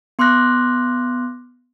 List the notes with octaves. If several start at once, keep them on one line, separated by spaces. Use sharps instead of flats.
B3 C6 D6 F6 F#6 A#6